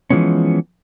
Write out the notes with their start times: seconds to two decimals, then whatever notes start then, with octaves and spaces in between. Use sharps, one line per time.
0.10 E3 F3 G#3 B3 C#4